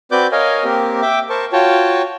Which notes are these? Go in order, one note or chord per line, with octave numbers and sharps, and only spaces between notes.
C4 F#4 B4 D5 D6 G6
A#4 C#5 D#5 F5 G#5
A#3 C4 G4 A#4
E5 G5 D6
A#4 C5 A5 C#6
F4 F#4 C#5 G5 A5